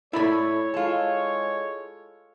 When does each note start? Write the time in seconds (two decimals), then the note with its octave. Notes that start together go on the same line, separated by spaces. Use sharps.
0.13 A2 A3 E4 C#5 D5 B5
0.74 G#3 F4 A4